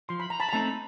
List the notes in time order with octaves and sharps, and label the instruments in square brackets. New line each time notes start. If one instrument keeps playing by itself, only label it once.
[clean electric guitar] F3 [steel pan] C6
[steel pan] B5
A#5
A5 B5
A#5
[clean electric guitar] A3 C4 D#4 [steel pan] A5 B5